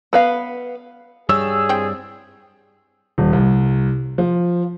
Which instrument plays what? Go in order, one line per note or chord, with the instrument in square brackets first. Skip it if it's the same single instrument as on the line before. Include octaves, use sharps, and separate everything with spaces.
[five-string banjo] B3 B4 F5
[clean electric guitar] G2 G3 C#5 [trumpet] G#4 [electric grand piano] E6
[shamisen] C4 E4 G5
[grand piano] D#1
C2
F3